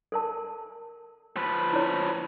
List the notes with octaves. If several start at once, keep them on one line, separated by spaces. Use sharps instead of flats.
A4 A#4 A5
F3 B4
E4 C#5